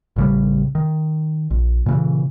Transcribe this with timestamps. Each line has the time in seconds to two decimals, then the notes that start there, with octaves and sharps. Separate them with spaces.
0.16 A1 C#3 G3
0.75 D#3
1.51 A#1
1.86 A#2 C#3 E3